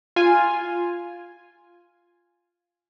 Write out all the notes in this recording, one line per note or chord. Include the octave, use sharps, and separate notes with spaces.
F4 G#5